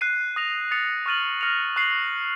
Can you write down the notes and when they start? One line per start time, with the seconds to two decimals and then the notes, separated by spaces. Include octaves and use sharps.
0.01 F#6 C7 D#7
0.36 D#6 A#6 F7
0.71 D#6 A6 C#7 F7
1.06 C#6 F6 A6 D#7 F#7
1.41 F6 A#6 C#7 F7
1.76 C#6 F#6 C7 F#7